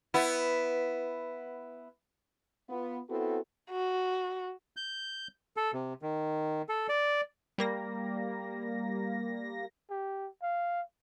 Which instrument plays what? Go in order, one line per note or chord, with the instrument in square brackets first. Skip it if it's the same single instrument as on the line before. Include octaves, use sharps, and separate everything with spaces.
[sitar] B3 E4
[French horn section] B3 F4
B3 C4 E4 F#4 A4
[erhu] F#4
[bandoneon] G6
A4
C3
D#3
A4
D5
[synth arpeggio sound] G3 A#3 A#6
[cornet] G4
F5